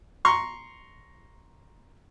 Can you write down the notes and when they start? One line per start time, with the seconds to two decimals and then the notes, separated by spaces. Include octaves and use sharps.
0.25 A#5 C6 C#6